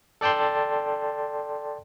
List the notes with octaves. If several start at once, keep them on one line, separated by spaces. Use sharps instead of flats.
A4 D5 G5 A5 C6